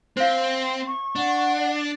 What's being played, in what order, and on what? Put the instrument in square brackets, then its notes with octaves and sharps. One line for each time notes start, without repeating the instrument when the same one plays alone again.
[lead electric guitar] C4 [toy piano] C5 F5
[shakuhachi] C#6
[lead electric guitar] D4 [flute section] D5 F#5